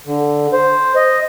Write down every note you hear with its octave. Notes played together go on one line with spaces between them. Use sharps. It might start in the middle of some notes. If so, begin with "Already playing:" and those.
D3
C5
D#5